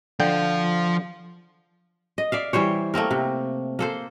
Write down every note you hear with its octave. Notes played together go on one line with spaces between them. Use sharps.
D3 F3 F5 G5
D#5
D5 E5 F5
E3 G3 C5 C#5
A3 A#3 C4 A#4
C3
A#3 A4 C5